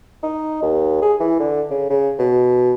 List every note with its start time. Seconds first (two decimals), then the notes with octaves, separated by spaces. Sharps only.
0.23 D#4
0.62 D#2
1.02 G#4
1.20 E3
1.40 D3
1.70 C#3
1.90 C#3
2.19 B2